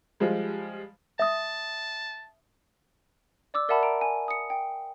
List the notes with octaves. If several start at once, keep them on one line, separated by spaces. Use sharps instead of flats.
F3 G3 G#3
E5 A5 D#6
D5 D6 E6
A#4 D5 E5 F#5 A5 B5
A#5 D7
G#5
D#6 C#7
G5